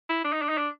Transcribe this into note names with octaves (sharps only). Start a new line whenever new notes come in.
E4
D4
D#4
D4
D#4
D4